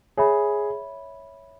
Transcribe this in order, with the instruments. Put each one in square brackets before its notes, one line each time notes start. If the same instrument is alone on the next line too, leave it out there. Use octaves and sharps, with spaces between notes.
[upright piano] G#4 [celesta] C#5 E5 B5